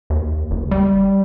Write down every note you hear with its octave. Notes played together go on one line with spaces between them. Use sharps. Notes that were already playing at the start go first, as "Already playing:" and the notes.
D#2
F#1
G3